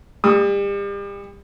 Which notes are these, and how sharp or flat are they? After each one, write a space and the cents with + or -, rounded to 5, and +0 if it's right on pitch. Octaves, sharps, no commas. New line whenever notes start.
G3 +35 D#6 +5